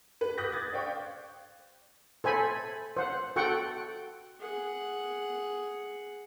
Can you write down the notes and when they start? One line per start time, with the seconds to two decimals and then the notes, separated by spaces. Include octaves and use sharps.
0.21 B4
0.37 D6 D#6 F#6 G6 A#6 B6
0.52 G#6 A6
0.73 C5 D5 F5 G5 C#6
2.24 A4 C5 G#5 B5
2.97 C5 F#5
3.36 F#4 A4 F#5 G5 C#6
4.40 G#4 F#5